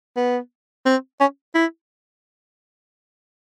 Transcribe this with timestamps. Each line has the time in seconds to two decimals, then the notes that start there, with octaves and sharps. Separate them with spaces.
0.17 B3
0.86 C4
1.20 C#4
1.55 E4